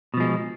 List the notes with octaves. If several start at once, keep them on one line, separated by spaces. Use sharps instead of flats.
B2 F3 G#3